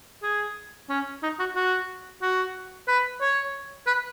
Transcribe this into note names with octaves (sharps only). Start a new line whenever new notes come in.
G#4
C#4
D#4
F#4
F#4
F#4
B4
C#5
B4